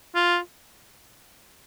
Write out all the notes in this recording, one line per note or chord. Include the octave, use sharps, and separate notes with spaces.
F4